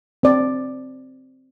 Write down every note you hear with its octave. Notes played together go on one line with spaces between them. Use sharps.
C4 D5